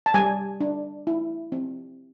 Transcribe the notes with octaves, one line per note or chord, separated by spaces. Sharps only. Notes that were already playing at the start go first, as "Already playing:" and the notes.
A5
G3 G#5
D4
E4
C4